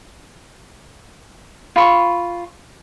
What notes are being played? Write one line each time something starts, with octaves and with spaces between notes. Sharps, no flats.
F4 B5 C#6